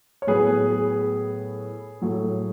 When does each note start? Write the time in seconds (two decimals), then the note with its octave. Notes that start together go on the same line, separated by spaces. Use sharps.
0.22 C#5
0.27 A2 F#3 B3 G#4 B4
0.72 G#4
2.01 A2 F#3 A3